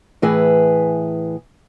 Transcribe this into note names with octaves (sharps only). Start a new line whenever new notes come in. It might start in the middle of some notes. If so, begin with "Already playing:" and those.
A2 E3 G#4 B4 E5